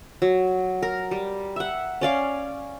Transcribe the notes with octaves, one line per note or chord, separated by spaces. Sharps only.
F#3
A#4
G3
E5 F#5
C#4 D5 F5 D6